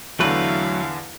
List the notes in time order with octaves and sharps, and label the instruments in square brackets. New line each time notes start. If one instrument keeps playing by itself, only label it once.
[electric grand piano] E2 D3 [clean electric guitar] F#3 A3 B4 [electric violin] E4 F5